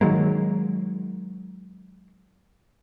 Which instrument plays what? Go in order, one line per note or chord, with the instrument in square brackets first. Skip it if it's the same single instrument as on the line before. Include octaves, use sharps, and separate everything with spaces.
[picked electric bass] D#3 F#3 G#3 A#3